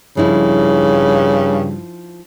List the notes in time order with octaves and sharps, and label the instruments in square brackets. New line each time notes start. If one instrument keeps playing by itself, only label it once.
[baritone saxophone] G2 [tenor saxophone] C#3 [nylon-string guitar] F3 D#4 E4